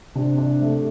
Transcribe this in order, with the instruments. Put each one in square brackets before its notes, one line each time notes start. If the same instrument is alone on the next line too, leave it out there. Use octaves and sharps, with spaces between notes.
[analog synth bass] C3 [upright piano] D4
[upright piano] D4
A3